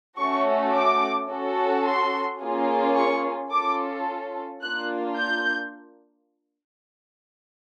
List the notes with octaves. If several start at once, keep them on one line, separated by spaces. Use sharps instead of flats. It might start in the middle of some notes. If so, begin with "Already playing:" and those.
A3 C#4 F#4 A4 C#6
D6
C#4 F#4 A4
C6
A#3 C#4 F4 G#4
C#6
C#4 F4 A4 D6
A#3 D4 F4 F#6
G6